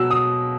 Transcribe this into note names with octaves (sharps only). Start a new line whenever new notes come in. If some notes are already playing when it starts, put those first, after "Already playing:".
Already playing: B2 F#3 E6
D#6